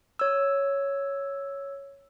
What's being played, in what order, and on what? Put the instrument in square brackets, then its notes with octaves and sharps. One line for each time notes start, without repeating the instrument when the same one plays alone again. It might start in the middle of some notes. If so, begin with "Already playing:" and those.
[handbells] C#5 E6